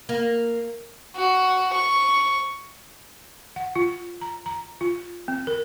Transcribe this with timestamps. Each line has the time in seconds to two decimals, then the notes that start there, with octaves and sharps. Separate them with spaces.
0.09 A#3
1.16 F#4
1.73 C#6
3.56 F#5
3.76 F4
4.21 A#5
4.46 A#5
4.81 F4
5.28 C4
5.47 A#4